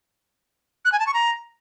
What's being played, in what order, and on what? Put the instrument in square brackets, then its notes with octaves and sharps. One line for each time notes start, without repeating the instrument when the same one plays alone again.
[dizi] F#6
G#5
A5
C#6
A#5